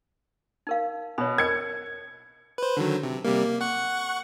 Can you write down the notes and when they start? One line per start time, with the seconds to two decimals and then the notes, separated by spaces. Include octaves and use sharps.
0.67 D#4 A#4 F5
1.18 B2 C#5 B5
1.38 A#4 G#6 C#7
2.58 B4 C5
2.77 D3 D#3 F#3
3.03 C3
3.25 C3 G3 A#3
3.45 A#3
3.61 F#5 C#6 F#6